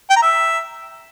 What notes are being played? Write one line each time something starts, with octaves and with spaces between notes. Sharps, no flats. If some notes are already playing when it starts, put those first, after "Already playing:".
G5
A#5
E5